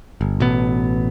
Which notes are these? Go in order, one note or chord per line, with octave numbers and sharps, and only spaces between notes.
G1
A1 B2 B3